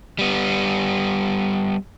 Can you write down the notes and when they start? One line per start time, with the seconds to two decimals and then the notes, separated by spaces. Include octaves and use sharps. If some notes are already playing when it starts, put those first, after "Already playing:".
0.19 G3 B3